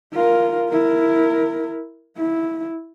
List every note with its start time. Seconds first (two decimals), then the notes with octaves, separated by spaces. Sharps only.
0.14 F4 A#4
0.70 E4 A#4
2.17 E4